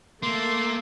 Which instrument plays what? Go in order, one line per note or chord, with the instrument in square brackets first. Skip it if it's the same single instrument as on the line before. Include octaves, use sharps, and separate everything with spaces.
[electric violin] A3 A4 [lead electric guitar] A#3 [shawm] C6